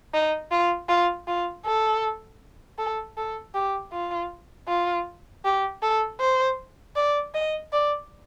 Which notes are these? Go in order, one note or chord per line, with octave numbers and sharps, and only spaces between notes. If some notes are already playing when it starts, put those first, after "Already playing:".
D#4
F4
F4
F4
A4
A4
A4
G4
F4
F4
G4
A4
C5
D5
D#5
D5